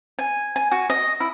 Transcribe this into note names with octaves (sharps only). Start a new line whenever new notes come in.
G#5
G#5
F#4
D#5
E4